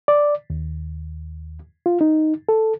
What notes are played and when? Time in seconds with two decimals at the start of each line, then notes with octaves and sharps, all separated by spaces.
0.08 D5
0.50 D#2
1.86 F4
2.01 D#4
2.49 A4